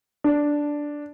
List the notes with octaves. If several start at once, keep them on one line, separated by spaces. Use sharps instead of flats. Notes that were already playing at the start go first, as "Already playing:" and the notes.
D4